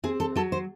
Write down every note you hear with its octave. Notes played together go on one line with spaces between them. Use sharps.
C4 G#4
A4
F#3 A4
C5